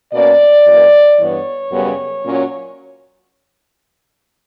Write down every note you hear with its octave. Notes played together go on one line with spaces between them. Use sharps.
B2 A#3 C#4 D5
F#2 E3 A#3
G2 E3 B3 C#5
F#2 C#3 G3 B3
A#2 F#3 C#4